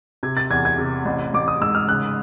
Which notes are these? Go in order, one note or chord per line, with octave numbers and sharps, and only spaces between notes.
C3 G#6
A6
E2 G#6
G#6
C3
A1
A1 D6
D#6
G#2 E6
F6
C#3 F#6